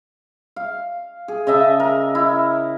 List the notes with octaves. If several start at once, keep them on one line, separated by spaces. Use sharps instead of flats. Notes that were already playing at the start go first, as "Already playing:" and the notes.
F5
G#4
C#3 D#5 E5 A5
A#4
E4